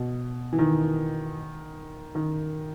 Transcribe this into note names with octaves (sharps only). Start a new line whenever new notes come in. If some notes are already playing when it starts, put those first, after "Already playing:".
Already playing: B2
E3
D#3
D#3